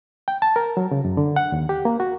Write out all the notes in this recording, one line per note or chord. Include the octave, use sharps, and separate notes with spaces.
G5
A5
A#4
F#3
C#3
F#2
D3
F#5
D#2
G4
A#3
F#4